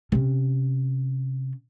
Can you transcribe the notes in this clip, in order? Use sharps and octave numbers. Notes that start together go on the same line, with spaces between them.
C3 C#4